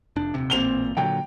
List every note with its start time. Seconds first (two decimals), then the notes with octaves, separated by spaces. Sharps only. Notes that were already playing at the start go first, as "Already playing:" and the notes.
0.16 F1 D4
0.34 D#1 A#1 C3
0.50 A1 A#2 C4 F7 G7
0.97 A#2 D3 F#3 G5